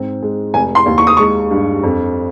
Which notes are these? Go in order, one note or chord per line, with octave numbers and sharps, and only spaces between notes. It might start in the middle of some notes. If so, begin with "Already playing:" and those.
Already playing: G#2 C4
G#3
F1 G#5
C6
D#2
C#6
D#6
G#3 C#6
G2
F2